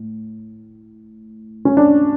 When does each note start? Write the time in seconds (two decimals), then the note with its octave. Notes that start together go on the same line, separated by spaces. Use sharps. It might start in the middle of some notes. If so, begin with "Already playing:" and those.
Already playing: A2
1.65 C#4
1.77 D4